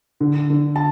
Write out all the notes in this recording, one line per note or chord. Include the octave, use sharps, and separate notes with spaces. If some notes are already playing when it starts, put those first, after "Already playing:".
D3
D3
A5